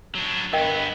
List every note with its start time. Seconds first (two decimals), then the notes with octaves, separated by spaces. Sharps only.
0.15 F#3 D4
0.53 G2 B3 A#4 D#5 G5